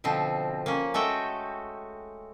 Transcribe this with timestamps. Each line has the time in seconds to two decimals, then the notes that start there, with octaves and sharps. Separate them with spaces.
0.04 B2 D3 F3 C4
0.66 A#3 C#4
0.94 G#3 A3 F#4 A4 G5